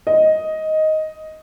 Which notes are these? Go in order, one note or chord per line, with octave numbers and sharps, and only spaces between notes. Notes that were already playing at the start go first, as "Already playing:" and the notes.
D#5